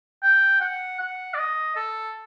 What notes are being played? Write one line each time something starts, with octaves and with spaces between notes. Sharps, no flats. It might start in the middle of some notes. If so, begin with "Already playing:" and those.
G5
F#5
F#5
D5
D#5
A4